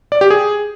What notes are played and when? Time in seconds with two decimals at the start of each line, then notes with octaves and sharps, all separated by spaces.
0.12 D5
0.21 G4
0.31 G#4